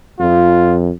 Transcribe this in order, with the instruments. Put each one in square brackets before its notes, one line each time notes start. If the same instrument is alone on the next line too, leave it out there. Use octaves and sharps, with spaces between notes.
[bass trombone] F2 [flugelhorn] F4